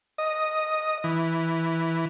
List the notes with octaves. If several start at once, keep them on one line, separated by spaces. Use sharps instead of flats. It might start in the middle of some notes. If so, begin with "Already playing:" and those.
D#5
E3